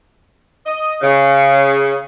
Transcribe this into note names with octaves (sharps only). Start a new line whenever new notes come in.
D#5
C#3